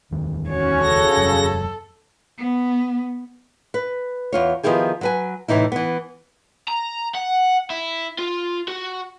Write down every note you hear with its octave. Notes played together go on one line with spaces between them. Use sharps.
D#1 F2 D#3
C#4 F#4 C#5
C#3 A4 A#6
E1 F#2
B3
B4
E2 F4 C#5
D#3 F3 B3 E4 G4 G#4
F#3 B4 G#5
A2 C3 E3 D#4 E4
E3 B3
A#5
F#5
E4
F4
F#4